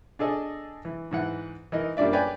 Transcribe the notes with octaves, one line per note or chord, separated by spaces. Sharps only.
D4 G#4 A4 D#5
E3
G#2 E3 F#5
E3 D#4 A#4 D#5
F#2 G3 A#3 D4 D5 E5
B4 C#5 D5 G5 G#5